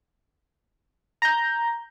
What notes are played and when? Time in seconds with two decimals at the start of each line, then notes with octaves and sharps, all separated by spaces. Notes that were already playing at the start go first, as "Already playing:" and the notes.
1.22 A#5 G6